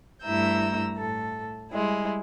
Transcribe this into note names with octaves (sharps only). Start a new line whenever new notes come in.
G2 A3 E4 A#5 E6 G6
A2 A4
G3 G#3 E4